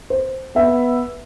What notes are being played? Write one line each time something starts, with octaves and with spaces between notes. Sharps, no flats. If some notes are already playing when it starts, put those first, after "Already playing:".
C5
B3 E5